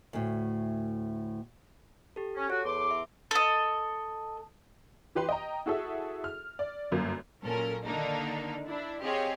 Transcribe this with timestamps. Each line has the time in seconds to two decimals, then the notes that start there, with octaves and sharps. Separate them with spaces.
0.13 D2 A2
2.16 G4 A4
2.36 C#4
2.50 F#4 A4 C#5
2.65 E2 C6 D6
2.91 E5
3.31 A4 D#5
5.15 E3 G4 B4 C6
5.29 D#5 G5 A#5
5.66 E4 F#4 G#4 A4 E5
6.24 F6
6.59 D5
6.91 G1 F#2 A#3
7.44 A#2 F#3 C#4 A4 A#4
7.84 D3 D#3 A#3 D4 D#4
8.67 D4 E4
9.02 C4 G4 G#4 C#5 D#5 F5